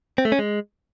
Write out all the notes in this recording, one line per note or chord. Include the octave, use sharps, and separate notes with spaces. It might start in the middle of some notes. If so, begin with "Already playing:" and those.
C4
A3
C#4
G#3